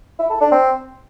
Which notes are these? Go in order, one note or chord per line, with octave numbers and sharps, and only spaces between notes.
E4
A4
D4
C4